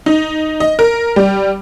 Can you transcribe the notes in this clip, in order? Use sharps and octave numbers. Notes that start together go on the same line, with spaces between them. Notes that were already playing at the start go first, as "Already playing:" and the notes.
D#4
D#5
A#4
G3